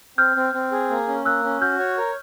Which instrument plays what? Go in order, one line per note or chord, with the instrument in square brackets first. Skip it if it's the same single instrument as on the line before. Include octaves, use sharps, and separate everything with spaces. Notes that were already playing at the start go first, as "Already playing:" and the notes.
[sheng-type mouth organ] C4 [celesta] F6 G6
[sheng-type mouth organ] C4
C4
G#4
A#3
C#4
[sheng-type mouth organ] A#3 [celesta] E6 F#6
[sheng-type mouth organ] C#4
[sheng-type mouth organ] F#4 [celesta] F6 G6
[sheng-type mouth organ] C#5
A#4